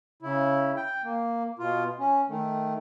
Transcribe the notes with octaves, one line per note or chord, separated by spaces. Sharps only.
C#3 E4
G5
A#3
B2 F4
C#4
D#3 A3